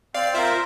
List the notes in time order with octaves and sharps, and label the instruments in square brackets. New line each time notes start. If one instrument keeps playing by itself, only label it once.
[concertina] C4 [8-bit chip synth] D5 F5
[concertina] F4 A#4 [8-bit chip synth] C5 E5